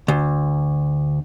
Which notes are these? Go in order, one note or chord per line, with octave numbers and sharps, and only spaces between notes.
D2